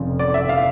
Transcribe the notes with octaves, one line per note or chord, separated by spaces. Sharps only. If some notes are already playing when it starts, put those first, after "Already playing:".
Already playing: F1 F2 C#3
D5
E5
F5